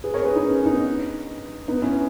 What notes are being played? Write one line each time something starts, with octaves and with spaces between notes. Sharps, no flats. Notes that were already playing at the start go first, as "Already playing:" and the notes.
G#4 B4
A#4 C#5
G#4 B4
D#4
C#4
B3 D#4
B3 D#4
C#4 E4